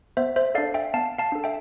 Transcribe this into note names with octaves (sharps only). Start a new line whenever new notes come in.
B3 C5 E5
C5 E5
D4 A4 D5 F5
E5 G5
B3 F5 A5
F5 A5
D4 A4
E5 G5